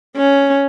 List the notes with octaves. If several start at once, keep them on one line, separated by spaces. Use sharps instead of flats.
C#4